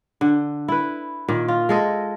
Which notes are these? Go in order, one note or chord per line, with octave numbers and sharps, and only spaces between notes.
D3
E4 B4
A#2 D#3
F4
G#3 A4 D#5